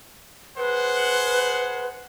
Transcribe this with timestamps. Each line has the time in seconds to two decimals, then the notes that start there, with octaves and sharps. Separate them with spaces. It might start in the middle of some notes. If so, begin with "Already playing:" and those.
0.58 G#4 B4 C5 F#5